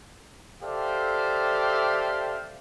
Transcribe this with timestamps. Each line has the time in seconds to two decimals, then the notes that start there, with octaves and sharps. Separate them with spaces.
0.63 G4 A4 C5 D5 E5 F5